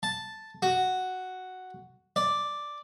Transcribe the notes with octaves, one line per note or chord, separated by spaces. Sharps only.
A5
F#4
D5